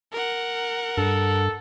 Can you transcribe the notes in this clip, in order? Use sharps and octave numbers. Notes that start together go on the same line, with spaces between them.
A#4 F#5
G2 A4